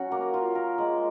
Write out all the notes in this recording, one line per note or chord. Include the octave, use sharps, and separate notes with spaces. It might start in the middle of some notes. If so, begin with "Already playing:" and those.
Already playing: F#3 C#4 F#4
A#3
F4
A#4
G#3